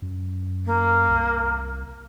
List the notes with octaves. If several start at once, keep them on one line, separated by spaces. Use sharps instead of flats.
F#2
A#3
C2